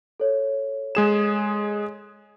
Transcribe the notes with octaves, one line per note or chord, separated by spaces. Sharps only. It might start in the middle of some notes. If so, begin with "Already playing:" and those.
A4 C#5
G#3 G#4 E7